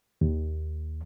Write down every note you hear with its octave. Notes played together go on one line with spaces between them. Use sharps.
D#2